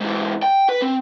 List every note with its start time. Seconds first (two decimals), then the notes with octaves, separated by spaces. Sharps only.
0.01 G#2 E3
0.43 G5
0.69 B4
0.82 C4